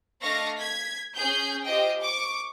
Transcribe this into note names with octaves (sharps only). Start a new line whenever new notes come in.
A3 D4 D#5 F5 C#6 A#6
G#6 B6
C#4 G#4 G6
F4 G4 C5 D#5 G5
C#6 D6